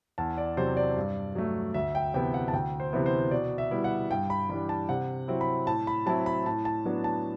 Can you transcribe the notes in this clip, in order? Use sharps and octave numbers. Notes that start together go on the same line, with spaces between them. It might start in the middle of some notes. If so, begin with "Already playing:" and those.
E2 A5
D5
C3 F#3 C4 C5
D5
G2
F#3 A3
D2 E5
G5
C3 E3 B3 E4 G5
F#5
A5
D2 G5
C5
C3 E3 B3 E4
C5
B2 D5
E5
G3 B3 E4
F#5
G2 G5
B5
E3 G3 D4 B5
A5
C3 F#5
F#3 C4 E4
B5
A2 A5
B5
F#3 C4 E4 A5
B5
A2 A5
A5
F#3 B3 D4
A5